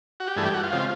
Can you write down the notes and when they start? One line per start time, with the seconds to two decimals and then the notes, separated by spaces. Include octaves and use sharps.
0.20 F#4
0.27 G4
0.36 G2 E3 A3 G#4
0.46 G4
0.54 F#4
0.63 F4
0.72 C#3 F3 G#3 C4